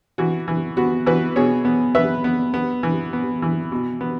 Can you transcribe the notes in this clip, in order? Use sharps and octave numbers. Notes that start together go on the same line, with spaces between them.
E3 F#4
E3
B3 F#4
E3 F#4 B4
B2 G#4 C#5
B3
B3 B4 E5
B3
B3
E3
B3
E3
B2
B3